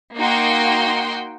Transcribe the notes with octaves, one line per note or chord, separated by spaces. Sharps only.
A#3 D#4 F#4 G5 C6